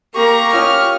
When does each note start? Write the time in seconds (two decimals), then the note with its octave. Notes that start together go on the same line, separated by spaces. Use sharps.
0.15 A#3 G4 A#5 C#6
0.53 C#4 F4 D#5 F6